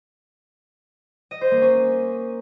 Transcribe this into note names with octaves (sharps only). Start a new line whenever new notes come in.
D#5
C5
A#3
C#4